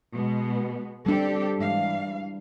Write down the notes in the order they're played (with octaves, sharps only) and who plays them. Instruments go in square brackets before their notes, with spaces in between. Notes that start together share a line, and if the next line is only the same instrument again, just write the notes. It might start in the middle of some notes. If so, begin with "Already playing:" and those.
[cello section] B2 G#3 B3
[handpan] G3 D4 [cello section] C4 G4 A4
[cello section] G#2 E3 F5